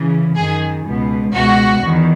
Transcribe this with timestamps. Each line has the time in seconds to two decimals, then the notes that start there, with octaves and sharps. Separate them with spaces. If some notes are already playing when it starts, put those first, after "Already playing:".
Already playing: C#3 E3
0.34 F#2 D#3 G#4
0.84 C#2 B2
1.33 C#2 B2 F#4
1.81 E2 D#3